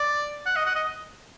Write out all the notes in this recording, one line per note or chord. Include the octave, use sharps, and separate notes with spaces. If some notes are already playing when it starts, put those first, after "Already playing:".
Already playing: D5
F#5
D#5
F#5
D#5